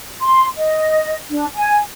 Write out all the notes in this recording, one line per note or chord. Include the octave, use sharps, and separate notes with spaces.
C6
D#5
D4
G#5